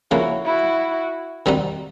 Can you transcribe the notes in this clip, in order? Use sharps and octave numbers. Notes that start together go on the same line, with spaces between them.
C#3 F3 A#3 E4 F#4
E4 F#4
D#3 G3 C4 D#4 F#4